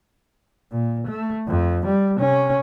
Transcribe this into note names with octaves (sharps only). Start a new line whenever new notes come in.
A#2
A3
F2
G3
C3 C#4